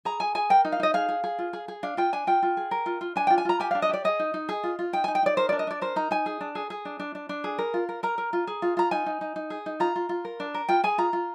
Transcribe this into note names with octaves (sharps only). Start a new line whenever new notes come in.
G#4 A#5
G#4 G#5
G#4 G#5
A#4 G5
D#4
F5
D#4 D#5
G#4 F5
G#4
G#4
F4
G#4
G#4
D4 F5
F4 G5
D4 G#5
F4 G5
F4
G#4
A#4
F4
F4
D4 G#5
F4 G5
G#5
F4 A#5
G4 G#5
D4 F5
D#5
G4 D5
G#4 D#5
D#4
D#4
G#4
F4
F4
D#4 G5
D#4 G#5
G5
D#4 D5
A#4 C5
D4 D5
D#5
D4 D5
A#4 C5
D#4 A#5
D#4 G#5
G#4
D4
G#4
G#4
D4
D4
D4
D4
G#4
A#4
F4
A#4
A#4 A#5
A#4
F4
G#4
F4
F4 A#5
D#4 G#5
D#4
D#4
D#4
G#4
D#4
F4 A#5
F4
F4
A#4
D4
A#4
F4 G5
G#4 G#5
F4 A#5
F4